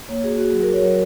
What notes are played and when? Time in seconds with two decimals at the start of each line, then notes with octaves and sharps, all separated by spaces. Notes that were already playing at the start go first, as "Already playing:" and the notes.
0.09 A#3 C#5
0.24 F#4 G#4
0.38 F#4
0.53 F#3 G#4
0.63 A#4
0.69 F#4 C#5
0.83 F#3 A#4